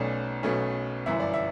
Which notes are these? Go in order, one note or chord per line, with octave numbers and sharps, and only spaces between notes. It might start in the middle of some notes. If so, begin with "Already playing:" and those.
Already playing: B1 B2 A3 C#4 D5
B1 B2 A3 C#4
G1 F#2 E3 E5
D5
E5